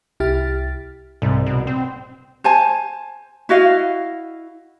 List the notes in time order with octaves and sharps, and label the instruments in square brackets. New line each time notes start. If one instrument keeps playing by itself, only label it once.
[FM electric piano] C2 E4 G4 F6 A6
[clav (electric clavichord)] C2 [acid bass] G#2
[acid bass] B2
C4
[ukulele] C5 G#5 A5
E4 F#4 D#5 F5